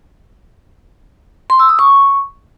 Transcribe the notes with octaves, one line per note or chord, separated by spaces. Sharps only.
C6
E6
D#6
C#6